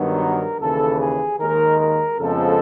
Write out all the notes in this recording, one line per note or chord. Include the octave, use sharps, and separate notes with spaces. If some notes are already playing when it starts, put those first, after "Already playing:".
Already playing: G2 D#3 F#3 B3
A#4
D#2 C#3 E3 A4
G#4
D#2 D#3 G#3 A#4
A#4
F2 C#3 F3 G#3 B3 A4